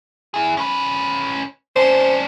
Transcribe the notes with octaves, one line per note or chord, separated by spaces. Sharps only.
E4 G#4
C#4 B4
C#4 D4 C5